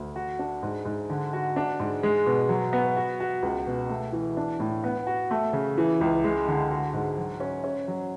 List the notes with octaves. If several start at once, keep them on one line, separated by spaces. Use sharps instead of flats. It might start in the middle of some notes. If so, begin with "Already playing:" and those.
Already playing: D2
F#4
D4
G#2
G#2
D3
F#4
D4
G#2
G#3
B2
F#3
B3
F#4
F#4
C#2
B2
A3
E3
D4
A2
B3
F#4
A3
C#3
E3
C#2
G#3
D3
F#4
G#2
F#3
C#4
C#4
F#3